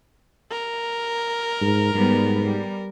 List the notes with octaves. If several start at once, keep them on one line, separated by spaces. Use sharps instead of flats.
A#4
G#2
G#2 G3 B3
G3